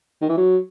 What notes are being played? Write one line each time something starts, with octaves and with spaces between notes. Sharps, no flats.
D#3
E3
F#3